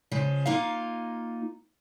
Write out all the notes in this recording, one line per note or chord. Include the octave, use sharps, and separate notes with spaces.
C#3 F3 G#3
A#3 D#4 F4 F5